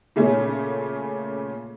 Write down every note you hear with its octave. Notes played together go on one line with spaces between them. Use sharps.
A#2 C#3 A3 C#4